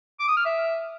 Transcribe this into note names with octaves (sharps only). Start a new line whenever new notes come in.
D6
D#6
F6
E5